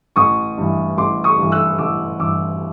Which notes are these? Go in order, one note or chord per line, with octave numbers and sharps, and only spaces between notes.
A1 C#6 D#6
G2 E3
A1 C6 D6
C#6 D#6
G2 E3
E6 F#6
A1 D6 E6
G2 E3 D6 E6